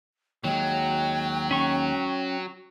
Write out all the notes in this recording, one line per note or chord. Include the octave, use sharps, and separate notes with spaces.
D#2 F#3 G#3 G5
C#4 C#6